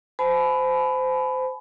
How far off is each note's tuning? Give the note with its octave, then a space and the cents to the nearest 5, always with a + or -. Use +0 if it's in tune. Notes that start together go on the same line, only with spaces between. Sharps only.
C5 -25 G#5 +45 B5 +15